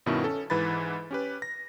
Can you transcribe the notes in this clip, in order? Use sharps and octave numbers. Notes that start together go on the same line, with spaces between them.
G2 B2 D#3 B3 C#4 E4
C#4 A4
G#2 E3 B4 B5 A6
C#4 G4 B4
A#6